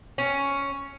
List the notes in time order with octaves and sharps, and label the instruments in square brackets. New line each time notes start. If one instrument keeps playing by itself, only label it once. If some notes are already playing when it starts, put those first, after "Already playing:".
[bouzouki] C#4